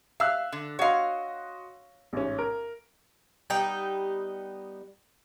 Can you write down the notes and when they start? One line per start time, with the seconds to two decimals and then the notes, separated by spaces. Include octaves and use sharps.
0.20 E5 F5 E6 F#6
0.52 D3
0.79 F#4 C#5 D#5 F5 C6
2.13 A1 G#2 C#4
2.38 A#4
3.50 G3 B3 D#4 G5